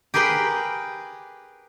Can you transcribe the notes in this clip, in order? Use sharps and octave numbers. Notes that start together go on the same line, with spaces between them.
G4 G#4 A#4 B4 G5